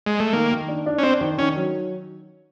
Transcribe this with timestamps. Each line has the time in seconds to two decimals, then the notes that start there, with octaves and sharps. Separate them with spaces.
0.06 G#3
0.20 A3
0.33 D#3 A#3
0.51 D#3
0.68 D4
0.86 D4
0.98 C#4
1.03 C4 D4
1.21 D#3
1.38 D#3 C#4
1.56 F#3